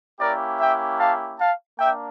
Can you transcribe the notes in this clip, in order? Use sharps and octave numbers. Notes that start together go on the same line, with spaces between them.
A#3 C#4 E4 G4 A#4 D5
E5 G5
F5 A5
F5 A5
A#3 D4 E5 G5